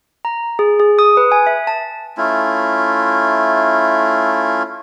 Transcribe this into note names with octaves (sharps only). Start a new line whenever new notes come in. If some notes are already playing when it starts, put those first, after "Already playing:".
A#5
G#4
G#4
D#6
B4
G#5
E5
A5
A3 C#4 E4 F4